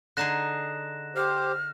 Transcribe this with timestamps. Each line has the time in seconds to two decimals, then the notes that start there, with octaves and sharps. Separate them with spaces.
0.17 D3 D#4 G#4 F#6 A#6 E7
1.16 G4 C5 F6